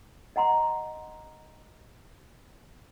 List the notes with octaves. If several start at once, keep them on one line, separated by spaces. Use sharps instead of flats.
D#5 F#5 A#5 C6